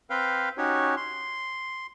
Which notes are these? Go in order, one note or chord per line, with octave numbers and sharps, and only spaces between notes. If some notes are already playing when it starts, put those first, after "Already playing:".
C4 B4 F5 G5
C#4 D#4 F#4 G4 C#5
C6